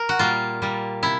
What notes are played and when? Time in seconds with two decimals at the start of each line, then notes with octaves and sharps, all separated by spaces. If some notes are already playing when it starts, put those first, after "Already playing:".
Already playing: A#4
0.09 F#4
0.19 A#2 G3 A#3 F4
0.62 A#2 G3 A#3
1.03 C3 E4